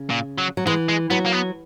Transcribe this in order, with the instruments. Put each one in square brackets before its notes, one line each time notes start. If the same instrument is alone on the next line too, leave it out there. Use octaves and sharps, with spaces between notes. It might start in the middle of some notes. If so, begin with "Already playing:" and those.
Already playing: [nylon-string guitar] C#3
[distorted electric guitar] A#2
F#3
[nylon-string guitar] F#3
[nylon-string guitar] E3 [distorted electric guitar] G#3
[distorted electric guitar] G#3
[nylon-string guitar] F#3 [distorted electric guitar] B3
[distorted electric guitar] A#3
B3